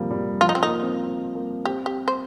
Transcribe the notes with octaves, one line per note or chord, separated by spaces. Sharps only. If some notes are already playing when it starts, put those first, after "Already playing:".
Already playing: C3 F3 G3 A#3
G3
F3 F4
D#4
C4
A#3 D#4
C4
C4
A#3
C4 G4
G4
C5